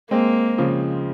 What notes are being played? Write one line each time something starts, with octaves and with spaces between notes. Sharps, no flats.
G#3 A#3 C4
C#3 F3